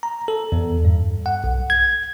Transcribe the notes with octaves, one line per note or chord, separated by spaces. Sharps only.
A#5
A4
E2
G2
F#5
B1
G#6